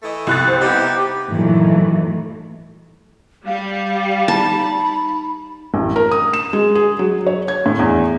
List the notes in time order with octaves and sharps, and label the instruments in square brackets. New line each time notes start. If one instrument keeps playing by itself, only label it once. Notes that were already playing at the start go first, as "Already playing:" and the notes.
[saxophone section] E3 A3 D#5
[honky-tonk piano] C2 F#6 A6
[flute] C5
[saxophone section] B3 D#4 E4 [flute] G4
[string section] G2 A#2 D#3 E3 F#3 A3
[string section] G3 [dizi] F5
[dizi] D#4 [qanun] A5 [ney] B5
[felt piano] A1
A#4
D#6
E7
G#3
G#4
F#3
C#5
G#6
A2
E2